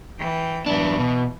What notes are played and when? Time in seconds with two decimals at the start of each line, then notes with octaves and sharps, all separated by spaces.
0.19 E3 G5
0.66 F#2 E3 B3 D4
0.99 B2